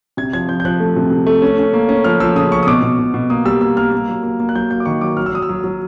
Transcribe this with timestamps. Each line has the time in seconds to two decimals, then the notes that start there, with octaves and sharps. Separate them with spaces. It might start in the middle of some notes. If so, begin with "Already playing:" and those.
0.17 C3 G#6
0.33 F3 G#6
0.48 F3 G6
0.60 G6
0.65 F3 F#6
0.80 A3
0.96 C3
1.11 C3
1.27 A3
1.42 C#4
1.59 C#4
1.73 A#3
1.89 C#4
2.04 F3 F6
2.20 F3 E6
2.36 C#3 D#6
2.51 C#4 C#6
2.63 D#6
2.67 B2 D6
2.82 B2
2.99 B2
3.14 B2
3.30 A#3 D#6
3.45 G3 E6
3.61 A#3 E6
3.77 A#3 F6
3.92 A#3
4.09 F#3
4.23 A#3
4.40 A#3
4.49 F#6
4.55 F#3 G6
4.71 A#3 G6
4.80 D6
4.85 D#3 C#6
5.01 F#3 D6
5.17 F#3 F6
5.26 E6
5.32 F#3 D#6
5.42 E6
5.49 F#3
5.64 F#3